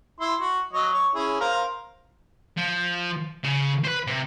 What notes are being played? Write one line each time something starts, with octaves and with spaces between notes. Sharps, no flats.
E4 C6
F#4
F#3 C#5 D#5
C#5
C#4 E4 G#4
A#4 C5 F5
F3
C#3
B4 C5
C3